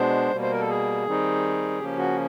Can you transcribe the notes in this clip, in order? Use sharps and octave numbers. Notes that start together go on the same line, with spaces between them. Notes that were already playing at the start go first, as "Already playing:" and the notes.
Already playing: B2 G#3 B3 D4 C5
B2 G3 A#3
C5
A#4
A4
G#4
D#3 G3 C4 D#4
C#3 F3 A#3 C#4 G4
F#4